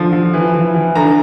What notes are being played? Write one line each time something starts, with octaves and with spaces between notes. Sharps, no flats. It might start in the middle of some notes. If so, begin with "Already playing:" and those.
Already playing: D3 F3
F3
E3
E3
E3
D3 A#5